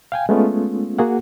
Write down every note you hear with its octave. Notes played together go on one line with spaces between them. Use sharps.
F5 G5 G#5
G#3 A3 B3 C#4 F4
A#3 F#4 G#4 F#5